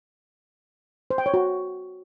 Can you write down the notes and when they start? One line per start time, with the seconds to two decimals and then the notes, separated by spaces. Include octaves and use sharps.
1.11 C5
1.18 G5
1.26 C#5
1.34 F#4